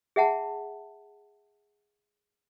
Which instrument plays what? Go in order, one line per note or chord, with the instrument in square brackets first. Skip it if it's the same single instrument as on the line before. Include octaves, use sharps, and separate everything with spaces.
[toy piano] G#4 E5 F#5 A5